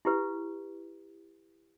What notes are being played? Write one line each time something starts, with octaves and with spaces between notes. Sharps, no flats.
E4 G4 B4